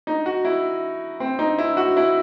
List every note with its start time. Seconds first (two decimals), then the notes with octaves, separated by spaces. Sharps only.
0.07 D#4
0.26 F#4
0.45 E4
1.20 C4
1.39 D#4
1.58 E4
1.77 F#4
1.97 E4